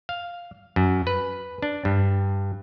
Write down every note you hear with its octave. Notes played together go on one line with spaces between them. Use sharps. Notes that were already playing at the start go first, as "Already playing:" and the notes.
F5
F#2
B4
D4
G2